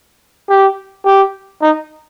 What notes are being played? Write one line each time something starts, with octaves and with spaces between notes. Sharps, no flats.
G4
G4
D#4